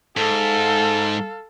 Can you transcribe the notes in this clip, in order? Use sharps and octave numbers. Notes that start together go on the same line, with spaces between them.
G#2 A4 F5